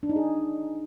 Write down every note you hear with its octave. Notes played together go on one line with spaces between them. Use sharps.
D4
D#4
G#4